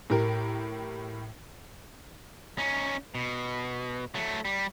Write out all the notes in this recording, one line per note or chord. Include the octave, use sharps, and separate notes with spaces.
A2 G4 A#4
C#4 D#4
B2
F#3 A3
G3